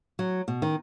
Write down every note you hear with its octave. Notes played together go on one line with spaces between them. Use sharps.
F#3
B2
D#3